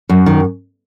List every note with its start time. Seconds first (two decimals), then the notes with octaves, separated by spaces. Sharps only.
0.09 F#2
0.26 D#3